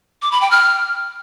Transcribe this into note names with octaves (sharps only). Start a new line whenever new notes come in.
D6
B5
G5
F6